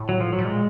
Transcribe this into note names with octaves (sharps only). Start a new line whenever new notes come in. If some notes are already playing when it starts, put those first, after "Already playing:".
Already playing: A2
F#3
F3
F#3
A2
A#2 G#3